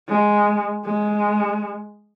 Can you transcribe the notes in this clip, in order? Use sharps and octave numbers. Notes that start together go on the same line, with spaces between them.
G#3
G#3